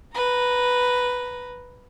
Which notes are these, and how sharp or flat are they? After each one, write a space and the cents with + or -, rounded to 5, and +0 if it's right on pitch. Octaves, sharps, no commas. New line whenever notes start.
B4 +0 A#5 +0